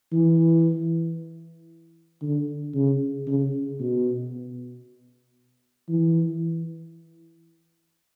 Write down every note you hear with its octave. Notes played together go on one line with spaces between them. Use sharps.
E3
D3
C#3
C#3
B2
E3